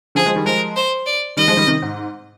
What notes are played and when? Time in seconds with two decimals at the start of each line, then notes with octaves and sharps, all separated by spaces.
0.15 D3 F3 G#4
0.26 F3 G#3
0.35 D#3 G3
0.45 F3 G#3 A#4
0.76 C5
1.06 D5
1.37 D#3 G3 D#5
1.48 F3 G#3
1.57 D#3 G3
1.67 C3 D#3
1.82 G#2